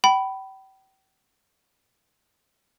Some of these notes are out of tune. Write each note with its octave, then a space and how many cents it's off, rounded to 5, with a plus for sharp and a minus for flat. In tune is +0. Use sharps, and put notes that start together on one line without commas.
G5 -35 B5 +0